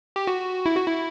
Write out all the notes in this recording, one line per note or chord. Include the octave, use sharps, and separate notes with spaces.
G4
F#4
E4
F#4
E4